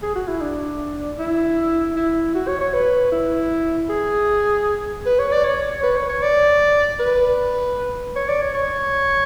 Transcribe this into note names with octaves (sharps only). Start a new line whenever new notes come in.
G#4
F#4
E4
D4
E4
E4
F#4
C#5
C#5
B4
E4
G#4
B4
C#5
D5
C#5
B4
C#5
C#5
D5
B4
C#5
D5
C#5
C#5